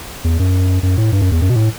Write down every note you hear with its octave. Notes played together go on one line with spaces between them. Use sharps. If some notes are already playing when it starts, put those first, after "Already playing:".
E2
F#2
F#2
A2
G2
F#2
E2
F#2
B2
A2